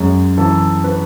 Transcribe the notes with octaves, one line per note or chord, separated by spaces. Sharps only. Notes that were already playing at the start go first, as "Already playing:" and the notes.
Already playing: F#2 G#3
E3 A4
B4